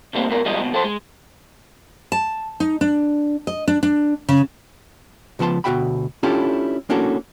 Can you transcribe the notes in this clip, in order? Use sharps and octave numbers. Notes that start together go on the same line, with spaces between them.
B2 D3 F#3 G3 A#3 C4
G#2 B2 A#4
B1 G2 F3 G3 G#3 D#5
C#2 B2
F2 A4 C5
G#3
A5
D#4
D4
D#5
D4
D4
C#3
C#2 F3 B3 A5 C6
D2 B2 F#4 E5 G5 B5
C#4 D4 E4 F4 G4 A4
A#3 C#4 D4 E4 F#4 A4